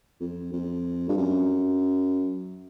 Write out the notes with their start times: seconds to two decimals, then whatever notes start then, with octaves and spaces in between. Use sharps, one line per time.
0.21 F2
0.53 F2
1.09 G2
1.17 F#2